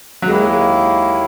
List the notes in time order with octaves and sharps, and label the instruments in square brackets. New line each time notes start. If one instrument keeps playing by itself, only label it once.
[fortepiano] F#3
[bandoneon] D#2 D#3 A#3 E4 [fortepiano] G#3
[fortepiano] G#3